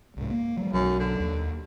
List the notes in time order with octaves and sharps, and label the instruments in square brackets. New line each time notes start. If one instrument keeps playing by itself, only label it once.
[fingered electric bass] C2 G#2
A#3
F#3 G#3
[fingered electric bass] B1 F#3 [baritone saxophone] F#2
[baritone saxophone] D3
[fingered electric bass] D#2